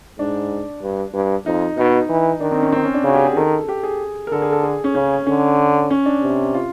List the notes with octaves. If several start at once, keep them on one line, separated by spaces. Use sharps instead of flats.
G#2 D4
G2
G2
F2 D#4
B2 D#4
E3
D#3 D4
C4
C#4
C4
C#4
D4
C#3 F#4
G4
G#4
D#3 A4
G4
G#4
A#4
D3 A4
G#4
A4
G#4
C#4
C#3 C#4
D3 C#4
C#4
D4
C3
F4